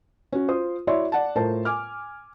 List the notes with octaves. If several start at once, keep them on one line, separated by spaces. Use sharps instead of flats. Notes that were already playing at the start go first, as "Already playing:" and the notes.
C#4 F#4
F4 C5 D#6
E4 F#4 C#5 D5 E5 C6
D5 F#5 A5
A2 F4 A#4 C5 A5
G#5 D6 F6